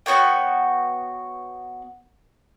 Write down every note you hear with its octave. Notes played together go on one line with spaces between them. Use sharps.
B3 F#4 C#5 G5